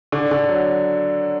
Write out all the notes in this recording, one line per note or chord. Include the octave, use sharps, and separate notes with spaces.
D3
D3
F#3